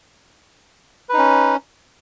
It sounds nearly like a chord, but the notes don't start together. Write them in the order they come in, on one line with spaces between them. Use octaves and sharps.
B4 D#4 C#4